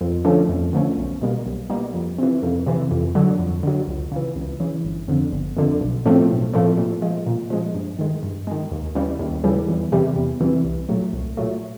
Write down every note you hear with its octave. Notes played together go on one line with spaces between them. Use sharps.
F2
D3 F3 A3 C#4
F2
D3 F3 A3 C#4
B1
B2 G3 A#3
B1
B2 G3 A#3
F2
C3 E3
F2
C3 E3
F2
D3 F#3
F2
D3 F#3
C#2
C#3 E3
C#2
C#3 E3
G1
F2 D3
G1
F2 D3
B1
A2 F3 A3 C4
B1
A2 F3 A3 C4
A#2
F3 G#3
A#2
F3 G#3
G2
D#3 G#3
G2
D#3 G#3
D#2
C#3 E3 G3
D#2
C#3 E3 G3
E2
C3 E3 G3
E2
C3 E3 G3
C2
A#2 F#3 A3
C2
A#2 F#3 A3